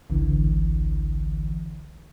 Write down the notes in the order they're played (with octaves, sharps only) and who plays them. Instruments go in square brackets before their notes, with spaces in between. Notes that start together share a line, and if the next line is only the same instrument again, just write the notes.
[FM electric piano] G#1 C#2 D3 E3